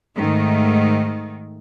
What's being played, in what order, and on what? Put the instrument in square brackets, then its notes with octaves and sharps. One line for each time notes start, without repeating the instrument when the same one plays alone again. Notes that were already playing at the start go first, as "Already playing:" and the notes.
[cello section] G#2 D#3 A3